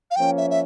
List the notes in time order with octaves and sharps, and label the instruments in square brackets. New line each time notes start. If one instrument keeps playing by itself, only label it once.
[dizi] F5
[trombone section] F3 A#3 C#4 [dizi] G5
[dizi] E5
E5